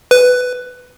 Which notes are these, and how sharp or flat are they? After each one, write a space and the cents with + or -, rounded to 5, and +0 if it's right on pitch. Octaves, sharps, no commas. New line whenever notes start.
B4 +10